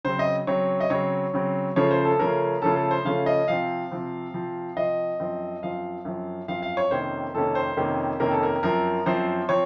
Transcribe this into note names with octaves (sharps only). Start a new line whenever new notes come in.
C#3 F#3 C4 C5
D#5
C#3 F#3 C4 C#5
D#5
C#3 F#3 C4 C#5
C#3 F#3 C4
C#3 F3 A3 C#4 C#5
C5
A4
C#3 F3 A3 C#4 A#4
C#3 F3 A3 C#4 A4
A4
C5
C#3 F3 A3 C#4 F5
D#5
C3 F3 C4 F5
C3 F3 C4
C3 F3 C4
C3 F3 C4 D#5
F#2 F3 C4
F#2 F3 C4 F5
F#2 F3 C4
F#2 F3 C4 F5
F5
C#5
F2 C3 D#3 A#3 C#4 C5
F2 C3 D#3 A#3 C#4 A4
C5
F2 C3 D#3 A#3 C#4
F2 C3 D#3 A#3 C#4 A#4
A4
A#4
F#2 F3 C4 A#4
F#2 F3 C4 C5
F3 C4 C#5